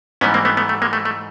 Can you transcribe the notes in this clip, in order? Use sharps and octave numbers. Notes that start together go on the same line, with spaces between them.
G#2 E3 G3 B3 C#4
A#3 C4
A3 B3
A3 B3
A3
G#3 A#3
A3
A3